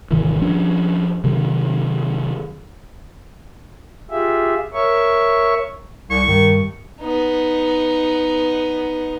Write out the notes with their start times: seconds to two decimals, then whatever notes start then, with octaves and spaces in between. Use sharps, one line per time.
0.11 G#1 C3 D#3 E3
0.42 F3 C#4 D4
1.24 C3 D#3 F#3
4.11 F4 G4 G#4 E5
4.73 A#4 C#5 E5 C#6
6.10 C2 C#6
6.28 G2 D#3
7.01 B3 D#4